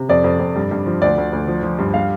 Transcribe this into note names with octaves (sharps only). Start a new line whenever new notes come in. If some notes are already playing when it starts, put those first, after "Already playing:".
Already playing: C3
F2 D5
F2
F2
G2
G2
F3
D2 D5
D2
D2
F3
F3
G2
G3 F5